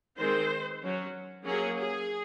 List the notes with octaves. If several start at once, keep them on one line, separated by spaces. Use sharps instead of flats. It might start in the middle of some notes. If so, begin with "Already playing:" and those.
D#3 G#3 C4 C5
F#3 C#4
F#3 A#3 C#4 G#4
G#4